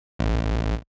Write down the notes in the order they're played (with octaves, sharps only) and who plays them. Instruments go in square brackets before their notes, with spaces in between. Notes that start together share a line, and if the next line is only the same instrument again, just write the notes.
[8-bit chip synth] A1